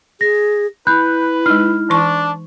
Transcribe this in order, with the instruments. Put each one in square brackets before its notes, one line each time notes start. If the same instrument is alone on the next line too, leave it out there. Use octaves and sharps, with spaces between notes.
[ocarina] G#4 [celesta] A#6
[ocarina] E4 [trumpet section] B4 [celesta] B5 F#6 G6
[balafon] G#3 D#4 [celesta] F6
[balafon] E3 C#6 [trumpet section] D4